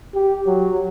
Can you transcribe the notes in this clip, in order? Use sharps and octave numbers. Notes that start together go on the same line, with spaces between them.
G4
F#3